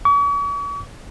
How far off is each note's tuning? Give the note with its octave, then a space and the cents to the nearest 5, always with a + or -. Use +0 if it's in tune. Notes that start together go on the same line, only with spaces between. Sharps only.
C#6 +45